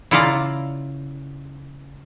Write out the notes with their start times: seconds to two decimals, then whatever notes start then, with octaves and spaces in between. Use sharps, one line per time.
0.11 C#3 E4 F4 D5 F5 A#5